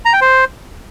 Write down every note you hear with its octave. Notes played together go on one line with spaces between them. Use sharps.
A#5
G5
C5